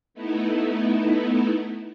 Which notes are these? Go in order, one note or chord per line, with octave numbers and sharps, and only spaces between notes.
A3 B3 D#4 E4